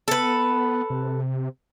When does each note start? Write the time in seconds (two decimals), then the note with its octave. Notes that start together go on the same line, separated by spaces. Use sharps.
0.08 B3 A4 B4
0.90 C3